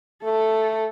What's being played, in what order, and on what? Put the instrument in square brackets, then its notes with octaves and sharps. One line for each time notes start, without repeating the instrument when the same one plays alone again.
[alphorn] A3 [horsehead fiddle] A4